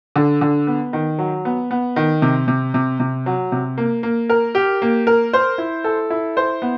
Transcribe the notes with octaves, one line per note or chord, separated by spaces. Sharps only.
D3
D3
B3
D#3
F#3
B3
B3
D#3
C3
C3
C3
C3
F#3
C3
A#3
A#3
A#4
G4
A#3
A#4
C5
E4
A4
E4
C5
B3